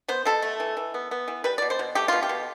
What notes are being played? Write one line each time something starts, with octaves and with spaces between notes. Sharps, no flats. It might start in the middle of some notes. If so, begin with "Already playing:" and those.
B3 C5
B2 A4
A3
E3
E3
B3
B3
E3
G3 B4
D5
B2
C5
B2
A3 G4
B2 F4
G4
B2